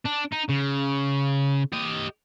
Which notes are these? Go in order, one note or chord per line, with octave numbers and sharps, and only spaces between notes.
D4
D#4
C#3
G4 D#5